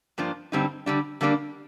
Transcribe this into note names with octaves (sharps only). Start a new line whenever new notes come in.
G2 F3 A#3 D4
G2 D3 G3 C4 D#4
D3 G3 D4
D3 G3 A#3 D4